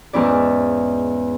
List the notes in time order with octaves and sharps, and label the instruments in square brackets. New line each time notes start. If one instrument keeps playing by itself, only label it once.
[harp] E2 G#2 C#4 E4 D5